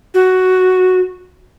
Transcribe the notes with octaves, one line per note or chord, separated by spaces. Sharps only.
F#4